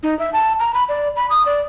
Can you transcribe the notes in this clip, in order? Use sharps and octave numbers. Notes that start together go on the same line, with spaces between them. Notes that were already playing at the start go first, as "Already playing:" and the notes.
D#4
E5
A5
A#5
B5
D5
B5
D#6
D5